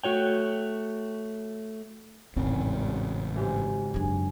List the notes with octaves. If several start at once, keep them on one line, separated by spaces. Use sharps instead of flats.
A3 F#4 C#5 G5
A1 F2 G#2 C#3 C4
G#1 G#3 G4
F#2 D4 G#4